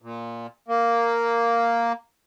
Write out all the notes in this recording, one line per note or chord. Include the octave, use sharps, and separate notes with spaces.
A#2
A#3